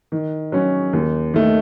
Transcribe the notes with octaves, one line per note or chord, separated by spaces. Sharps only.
D#3
F#3 C#4
D#2
D#3 A3